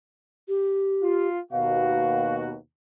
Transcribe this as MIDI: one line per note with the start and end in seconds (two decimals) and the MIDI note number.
0.48 1.28 67
1.02 1.40 65
1.52 2.55 39
1.52 2.55 47
1.52 2.55 66
1.52 2.35 77